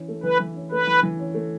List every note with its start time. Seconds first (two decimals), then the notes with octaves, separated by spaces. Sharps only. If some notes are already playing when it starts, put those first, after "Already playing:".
Already playing: E3 C#4
0.08 A3
0.24 E3 B4
0.39 E3
0.56 C#4
0.71 A3 B4
0.87 E3
1.03 E3
1.19 C#4
1.34 A3